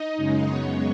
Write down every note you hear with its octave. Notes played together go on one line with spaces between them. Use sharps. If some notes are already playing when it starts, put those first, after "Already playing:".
Already playing: D#4 D#5
F#2 C#3 G#3
F#2 C#3 G#3 B3 C#5